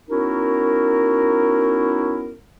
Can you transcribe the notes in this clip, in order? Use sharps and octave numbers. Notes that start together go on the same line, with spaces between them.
B3 C#4 D#4 E4 F#4 A#4